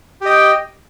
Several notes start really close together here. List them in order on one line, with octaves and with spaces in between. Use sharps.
G4 D#5 G5